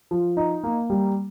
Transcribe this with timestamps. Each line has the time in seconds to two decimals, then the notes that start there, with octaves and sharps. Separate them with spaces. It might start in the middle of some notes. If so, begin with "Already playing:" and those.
0.11 F3
0.37 D#4
0.64 A#3
0.90 G3